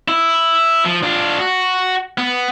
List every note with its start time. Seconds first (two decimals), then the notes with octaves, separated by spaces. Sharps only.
0.08 E4
0.85 F3
1.03 D4 F4
1.39 F#4
2.18 B3